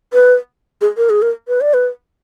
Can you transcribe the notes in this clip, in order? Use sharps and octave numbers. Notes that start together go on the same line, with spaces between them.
B4
G#4
A#4
G#4
A#4
B4
D5
B4